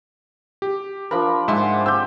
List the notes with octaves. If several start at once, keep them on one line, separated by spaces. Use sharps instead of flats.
G4
F3 D4 A#4 B5
G#2 G#3 E5 F#5 C6
C4 G4 E6 G6